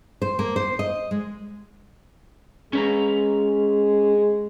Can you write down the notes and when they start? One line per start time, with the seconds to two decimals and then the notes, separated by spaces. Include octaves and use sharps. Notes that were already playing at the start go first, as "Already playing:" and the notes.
0.22 C5
0.39 A#3
0.56 C5
0.79 D#5
1.11 G#3
2.73 G#3 C#4 B4 A#5